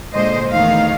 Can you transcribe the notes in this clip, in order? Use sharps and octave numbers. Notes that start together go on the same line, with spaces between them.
A#2 D3 G#3 C5 D#5
E2 D#3 A3 D#4 F5